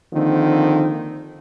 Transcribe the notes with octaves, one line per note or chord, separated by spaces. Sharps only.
D3 D#3 F3 A#3 C4